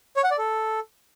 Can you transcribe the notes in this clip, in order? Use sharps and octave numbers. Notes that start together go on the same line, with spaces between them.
C#5
F#5
D5
A4